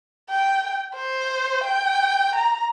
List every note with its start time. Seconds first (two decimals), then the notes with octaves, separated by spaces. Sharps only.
0.29 G5
0.95 C5
1.64 G5
2.35 A#5